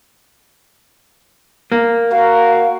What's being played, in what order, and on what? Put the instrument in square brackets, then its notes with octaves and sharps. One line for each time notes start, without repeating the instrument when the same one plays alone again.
[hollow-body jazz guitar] A#3
[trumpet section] F#4 A#4 [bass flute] F5